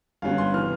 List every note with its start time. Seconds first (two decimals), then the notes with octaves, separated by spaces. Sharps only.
0.22 G1 G2 G3 C#4 F5
0.38 C6
0.54 C3 E3 F6